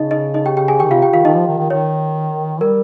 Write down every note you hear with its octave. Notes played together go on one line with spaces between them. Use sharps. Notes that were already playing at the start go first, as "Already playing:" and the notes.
Already playing: C#3 D#4 D#5
D#4 D#5
D#4 D#5
G4 G5
G4 G5
G#4 G#5
D#3 G4 G5
C3 F4 F5
G4 G5
D#3 F4 F5
D#3 D#4 D#5
F3
D#3
D#3
D#3 C#5
G3 A#4